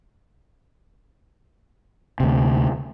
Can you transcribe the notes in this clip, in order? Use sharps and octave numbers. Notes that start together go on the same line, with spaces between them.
D2 C3